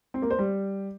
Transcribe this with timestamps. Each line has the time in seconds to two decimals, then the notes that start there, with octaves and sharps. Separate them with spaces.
0.14 C4
0.22 A#3
0.30 C5
0.39 G3